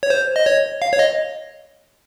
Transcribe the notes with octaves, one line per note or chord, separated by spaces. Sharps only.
C#5
C5
D#5
C#5
F5
C#5
D#5